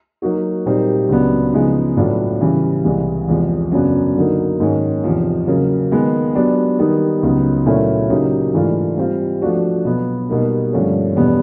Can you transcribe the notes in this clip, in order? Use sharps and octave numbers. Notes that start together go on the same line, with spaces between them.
F#3 A#3 D#4 F#4
A#2 G3 C4 D#4 G4
C#2 C#3 F#3 B3 D4
C#3 F3 G#3 B3 D#4
A2 F#3 B3 D4 F4
C#3 E3 G3
C2 C3 E3 G#3
E2 C3 F3 G#3
F#2 C#3 F#3 B3 D4
D3 F#3 A#3 D#4
G#2 D#3 G#3 C#4
E2 C3 F3
C#3 F#3 A#3
D#3 G#3 B3
F#3 B3 D4 G4
D#3 G3 B3 D#4
C#2 C#3 F#3 B3 D#4
A#2 F#3 A3 C#4 E4
C#3 F#3 A#3 D#4 G4
G#2 E3 A3 D4 F4
G3 C4 F4
F3 A3 D4 F#4
B2 F#3 B3
B2 G3 A#3 D#4
G2 D3 F3 A3 C#4
E2 B2 G3 B3 D4